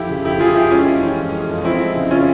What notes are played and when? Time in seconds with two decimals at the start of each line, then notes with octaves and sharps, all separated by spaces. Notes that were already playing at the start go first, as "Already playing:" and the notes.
Already playing: F2 F3 E4 G4
0.09 C#3
0.24 F2 E4 G4
0.40 F3 F4 G#4
0.56 F2 E4 G4
0.71 G#3 C#4 F4
0.87 F2
1.02 E3
1.19 F2
1.33 G#3
1.49 F2
1.65 F3 C4 E4
1.81 G#3
1.96 C#3
2.11 C#4 F4